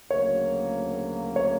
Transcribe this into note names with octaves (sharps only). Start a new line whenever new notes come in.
D2 C#3 F#3 A#3 C#5
C#5